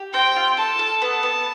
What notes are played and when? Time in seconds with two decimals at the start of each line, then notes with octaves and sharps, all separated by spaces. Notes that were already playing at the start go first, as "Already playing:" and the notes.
Already playing: G4
0.14 C4 G5
0.36 F4
0.57 A4 A5
0.79 A4
1.02 B3 A5
1.23 B3